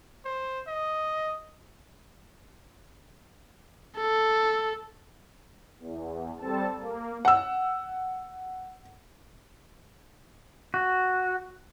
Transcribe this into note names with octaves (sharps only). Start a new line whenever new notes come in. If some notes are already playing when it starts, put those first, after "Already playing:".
C5
D#5
A4
E2
G3 C4 A4 A5
A#3
F#5 E6
F#4